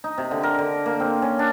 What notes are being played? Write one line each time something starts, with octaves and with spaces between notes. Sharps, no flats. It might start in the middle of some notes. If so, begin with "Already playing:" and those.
D#4
C3
D3
A#4
D3
A#3
C4
C#4
D4